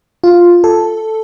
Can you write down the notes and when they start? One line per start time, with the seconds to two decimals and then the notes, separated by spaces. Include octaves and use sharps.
0.24 F4
0.64 A4